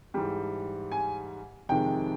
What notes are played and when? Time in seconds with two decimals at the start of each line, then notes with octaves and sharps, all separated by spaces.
0.14 G#2 E3 G3 G5
0.92 G#5
1.69 F2 C3 D#3 G#3 G5